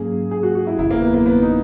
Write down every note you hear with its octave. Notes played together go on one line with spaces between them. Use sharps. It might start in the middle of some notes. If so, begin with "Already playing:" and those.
Already playing: G#2 F#3 A#3 C#4 G#4
G#4
F#4
F#4
E4
F#1 E2 C#3 E4
A#3
B3
A#3
B3
D#4